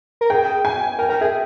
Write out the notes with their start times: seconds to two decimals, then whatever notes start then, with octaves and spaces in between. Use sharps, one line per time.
0.21 A#4
0.30 G#4 G5
0.65 G#5
0.99 A#4 G5
1.09 A#4 G5
1.21 G#4 E5